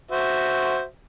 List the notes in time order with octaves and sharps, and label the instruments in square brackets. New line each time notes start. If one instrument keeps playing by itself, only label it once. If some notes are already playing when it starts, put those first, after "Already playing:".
[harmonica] F#4 C5 E5